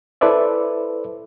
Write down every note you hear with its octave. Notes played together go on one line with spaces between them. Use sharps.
E4 A4 B4 C5 D5 E5